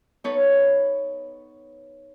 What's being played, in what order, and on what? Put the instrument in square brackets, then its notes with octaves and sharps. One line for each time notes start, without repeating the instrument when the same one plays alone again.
[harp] B3 D#4 A4 B4 C#5